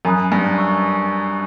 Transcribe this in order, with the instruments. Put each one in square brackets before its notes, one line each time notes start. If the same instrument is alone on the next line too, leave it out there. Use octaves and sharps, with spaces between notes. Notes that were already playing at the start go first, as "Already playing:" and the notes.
[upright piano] F#2 [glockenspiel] G#5 B5 D#6 F#6
[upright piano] G2
[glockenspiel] C#6 E6